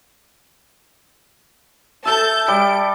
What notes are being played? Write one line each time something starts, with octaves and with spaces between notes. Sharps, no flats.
A4 E5 A5 G6
G3 D7